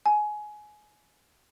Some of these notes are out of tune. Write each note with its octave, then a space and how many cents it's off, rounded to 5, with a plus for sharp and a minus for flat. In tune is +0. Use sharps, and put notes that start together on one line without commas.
G#5 +20